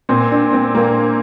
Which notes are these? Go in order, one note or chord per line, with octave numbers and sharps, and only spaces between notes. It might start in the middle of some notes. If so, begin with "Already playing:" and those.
A#2 C4
D4
C4
A#3